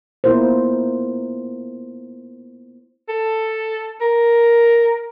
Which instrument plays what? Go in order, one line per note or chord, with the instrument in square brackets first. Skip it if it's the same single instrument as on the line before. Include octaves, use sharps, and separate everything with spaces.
[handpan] A#3 B3 E4 F4 A#4 C5
[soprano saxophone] A4
A#4